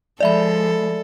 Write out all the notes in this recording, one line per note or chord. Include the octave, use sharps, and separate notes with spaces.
F3 G#3 A4 D5 E5 B5